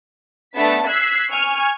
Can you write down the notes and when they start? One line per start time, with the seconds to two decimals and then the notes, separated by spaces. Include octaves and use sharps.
0.54 A3 B3 D4 A5 B6
0.88 E6 F#6 G#6 B6 C7
1.29 G#5 C#6 F6